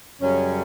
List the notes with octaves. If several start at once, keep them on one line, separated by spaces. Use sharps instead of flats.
F#2 C#3 G3 C#4